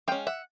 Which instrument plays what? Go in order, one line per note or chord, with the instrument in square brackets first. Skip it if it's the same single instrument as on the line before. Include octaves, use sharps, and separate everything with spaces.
[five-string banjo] G#3 C#4 F5 G5
E5 F#5